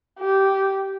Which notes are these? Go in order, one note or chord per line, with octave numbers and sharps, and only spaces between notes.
G4